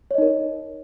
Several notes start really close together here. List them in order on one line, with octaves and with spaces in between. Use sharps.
C#5 D#5 D#4 A#4